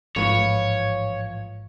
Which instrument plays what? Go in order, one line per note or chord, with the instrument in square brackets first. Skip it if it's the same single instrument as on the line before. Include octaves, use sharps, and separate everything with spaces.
[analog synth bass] A1 [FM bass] G#2 [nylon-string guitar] F3 F4 B4 [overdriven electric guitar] C#5